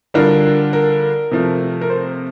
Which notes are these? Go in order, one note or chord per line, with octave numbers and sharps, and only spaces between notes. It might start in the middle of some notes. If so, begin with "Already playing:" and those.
D3 G3 D4 F4 A#4
A#4
C3 F3 A3
A#4
C5